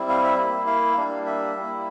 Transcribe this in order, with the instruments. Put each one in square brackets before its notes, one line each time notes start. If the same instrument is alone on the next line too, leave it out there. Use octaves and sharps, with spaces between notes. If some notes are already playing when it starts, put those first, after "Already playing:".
Already playing: [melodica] G3 C4 E4
F5
E5
A#3 E4
F5
G3 A#3 D4
E5
G3 A#3 E4